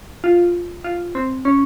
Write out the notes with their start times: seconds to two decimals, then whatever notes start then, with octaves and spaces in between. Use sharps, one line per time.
0.24 F4
0.84 F4
1.15 C4
1.45 C#4